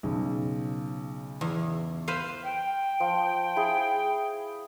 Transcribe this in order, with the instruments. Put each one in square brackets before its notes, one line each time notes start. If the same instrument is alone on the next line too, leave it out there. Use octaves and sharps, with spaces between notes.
[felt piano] B1 C#3
[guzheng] E2
B4 C5 F5
[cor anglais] G5
[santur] F3
E4 G#4